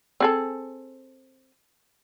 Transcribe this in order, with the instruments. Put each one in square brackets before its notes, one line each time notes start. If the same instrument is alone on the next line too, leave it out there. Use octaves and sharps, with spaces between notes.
[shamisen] C4 G#4 A4